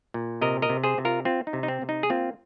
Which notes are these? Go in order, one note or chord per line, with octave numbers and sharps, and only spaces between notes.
A#2
C3 A#4 D#5
A#4 D#5
C3
G#4 C5
C3
F4 A#4
C4 F4
D#4
C3
D#4
C4
C3
D#4
G#4
A#3 C4 F4